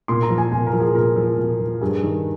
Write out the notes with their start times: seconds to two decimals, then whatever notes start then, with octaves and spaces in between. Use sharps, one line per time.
0.08 A#2 C6
0.23 A#5
0.30 F3
0.38 G#5
0.52 A#2 G#5
0.66 A#4
0.73 F3
0.80 G#4
0.95 A#2 A#4
1.16 F3
1.38 A#2
1.60 F3
1.81 G2 G#4
2.03 D#3